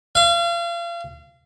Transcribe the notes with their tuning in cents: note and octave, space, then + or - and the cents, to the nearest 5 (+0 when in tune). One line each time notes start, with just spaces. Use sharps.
F5 -35